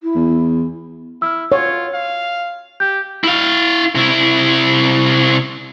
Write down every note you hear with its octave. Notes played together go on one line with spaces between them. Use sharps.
E4
E2
E4 E6 F6
F4 C#5
F5
G4 G6
E4 F5
C3 E4